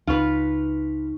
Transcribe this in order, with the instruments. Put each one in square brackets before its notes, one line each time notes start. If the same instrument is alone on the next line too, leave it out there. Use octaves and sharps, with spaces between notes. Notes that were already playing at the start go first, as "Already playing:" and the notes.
[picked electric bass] C#2 [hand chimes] D#4 C#6 [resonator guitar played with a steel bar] F4 B4